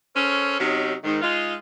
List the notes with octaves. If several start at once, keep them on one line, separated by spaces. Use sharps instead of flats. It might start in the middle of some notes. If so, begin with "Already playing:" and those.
C#4 A4 A#4 C5 C#5
C3 F#3 C#4 D#4
G#2 D#3
G#3 D#4 F4